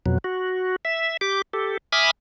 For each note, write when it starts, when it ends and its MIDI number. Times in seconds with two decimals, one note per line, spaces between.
0.06 0.18 41
0.06 0.18 47
0.06 0.18 54
0.24 0.76 66
0.85 1.17 76
1.21 1.42 67
1.21 1.42 86
1.53 1.77 67
1.53 1.77 69
1.92 2.11 76
1.92 2.11 80
1.92 2.11 83
1.92 2.11 86
1.92 2.11 87
1.92 2.11 89